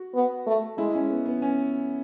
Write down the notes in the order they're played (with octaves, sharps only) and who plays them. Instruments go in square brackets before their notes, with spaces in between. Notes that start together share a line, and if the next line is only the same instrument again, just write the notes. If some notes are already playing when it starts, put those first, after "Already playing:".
Already playing: [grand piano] F#4
[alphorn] B3
A3
[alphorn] G#3 [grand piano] E4
[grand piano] C#4
B3
B3
C#4